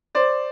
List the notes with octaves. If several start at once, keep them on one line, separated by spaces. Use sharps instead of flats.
C5 D5